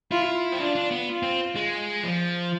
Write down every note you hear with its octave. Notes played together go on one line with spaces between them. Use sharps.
E4 F4
C4
D4 F4
D4
B3
F4
C4
G#3
F3